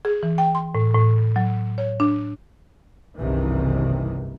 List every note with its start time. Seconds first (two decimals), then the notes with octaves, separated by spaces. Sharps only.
0.05 G#4
0.23 E3
0.38 G5
0.55 C6
0.75 A2
0.95 A2
1.36 F#3
1.78 C#5
2.00 D4
3.17 F#1 C2 G2 C3 D#3 E3